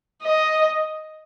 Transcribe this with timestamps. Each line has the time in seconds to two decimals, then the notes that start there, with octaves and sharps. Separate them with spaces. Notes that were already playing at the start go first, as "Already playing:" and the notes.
0.23 D#5